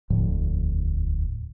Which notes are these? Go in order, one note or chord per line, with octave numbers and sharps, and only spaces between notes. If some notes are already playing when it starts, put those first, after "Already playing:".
E1 D2 A2 F3